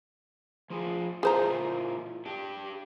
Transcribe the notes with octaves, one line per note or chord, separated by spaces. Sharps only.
F3 F4 G#4
A#2 E3 F4 G#4 C5 A#5
D4 G4